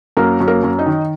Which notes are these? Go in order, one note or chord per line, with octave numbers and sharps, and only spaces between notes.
F#2 A#3 A#4
F#2
A#3 A#4
F#2
D#4 D#5
D#3